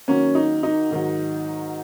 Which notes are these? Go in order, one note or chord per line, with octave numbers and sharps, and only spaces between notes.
D#3 F#3 A#3 C#4
D#4
D#4
G#2 D#3 F#3